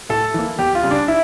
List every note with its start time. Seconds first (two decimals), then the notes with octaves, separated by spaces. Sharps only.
0.09 A2 A4
0.34 E3 A#3
0.59 E2 G4
0.75 F4
0.83 C#3 G3
0.91 D4
1.08 E4